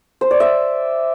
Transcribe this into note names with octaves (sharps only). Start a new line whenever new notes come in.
C5
D5
E5